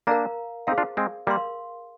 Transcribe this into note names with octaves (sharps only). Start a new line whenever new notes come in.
A#3 D4 A#4 F5 A#5
C4 D#4 G#4 C5 F5
D4 F4
G#3 C4
G3 A#3 A#4 F5 C6